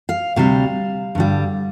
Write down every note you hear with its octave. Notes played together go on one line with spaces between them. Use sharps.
F5
D2 C3 G3 F5
G2 D3 G3